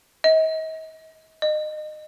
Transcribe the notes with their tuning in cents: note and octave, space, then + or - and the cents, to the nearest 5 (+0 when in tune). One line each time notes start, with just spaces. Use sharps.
D#5 +40
D#5 -25